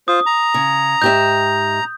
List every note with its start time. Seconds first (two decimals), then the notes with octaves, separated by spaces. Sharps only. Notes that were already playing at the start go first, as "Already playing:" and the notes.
0.08 F4 C5 D#6
0.26 A#5
0.54 C#3
1.02 G#2 G4 E5 G6